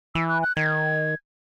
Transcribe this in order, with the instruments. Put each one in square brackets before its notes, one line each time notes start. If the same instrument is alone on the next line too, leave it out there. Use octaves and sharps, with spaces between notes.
[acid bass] E3 [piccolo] E6
[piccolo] F#6
F#6
[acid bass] D#3 [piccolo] G#6